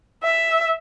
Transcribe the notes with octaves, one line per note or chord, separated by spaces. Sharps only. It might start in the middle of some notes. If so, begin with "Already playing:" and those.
E5